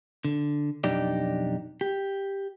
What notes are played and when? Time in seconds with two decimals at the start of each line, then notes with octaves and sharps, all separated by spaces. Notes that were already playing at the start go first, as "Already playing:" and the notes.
0.25 D3
0.84 B1 F2 D4 D#4 G4 D5
1.81 G4